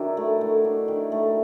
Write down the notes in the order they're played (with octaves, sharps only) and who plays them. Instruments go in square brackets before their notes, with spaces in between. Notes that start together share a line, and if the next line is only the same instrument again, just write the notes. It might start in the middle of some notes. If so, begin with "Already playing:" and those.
Already playing: [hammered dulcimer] D#3 F#3 D4 [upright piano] E4 F#4
[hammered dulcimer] A3
A3
D4
D#3
A3